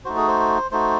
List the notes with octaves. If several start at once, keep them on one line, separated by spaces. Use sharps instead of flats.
A3 D#4 F#4 C5
G#4
C5
A3 D#4 F#4 C5